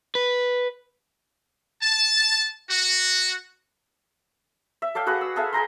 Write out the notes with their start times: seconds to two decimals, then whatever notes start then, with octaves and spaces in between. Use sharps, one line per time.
0.15 B4
1.81 A5
2.68 F#4
4.82 E5
4.95 A4 D5 F5 G5
5.06 F#4 G#4 B4 F#5
5.21 E6
5.36 G#4 A4 E5 F5
5.53 G#4 G5 A#5 C6